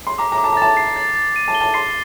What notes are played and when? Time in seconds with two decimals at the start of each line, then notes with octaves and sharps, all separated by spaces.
0.07 C6
0.18 A#5 D6
0.32 A#5
0.38 D6
0.44 A5
0.53 A#5
0.57 A5 A6
0.77 C7
0.96 A6
1.16 A6
1.36 D#7
1.48 A5
1.55 G7
1.61 A5
1.74 C6 C7